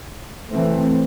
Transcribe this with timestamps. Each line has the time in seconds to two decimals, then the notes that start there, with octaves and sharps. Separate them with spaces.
0.51 E3 A3 C4